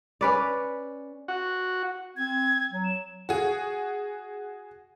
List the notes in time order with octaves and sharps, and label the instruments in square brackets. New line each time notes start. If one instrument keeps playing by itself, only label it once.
[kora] C#4 B4 D5
[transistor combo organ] F#4
[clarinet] C4 [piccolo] G#6
[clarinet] F#3
[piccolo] E7
[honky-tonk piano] F#4 G#4